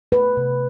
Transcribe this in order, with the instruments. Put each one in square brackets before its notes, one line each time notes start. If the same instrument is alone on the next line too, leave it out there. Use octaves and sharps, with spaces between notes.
[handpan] A3 B4
C3